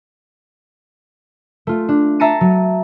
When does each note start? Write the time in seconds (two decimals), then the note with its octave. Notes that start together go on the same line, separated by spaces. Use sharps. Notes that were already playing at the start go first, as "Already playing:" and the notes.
1.67 A3 F4
1.89 D4
2.20 E5 A5 A#5 C7 C#7 D#7
2.41 F#3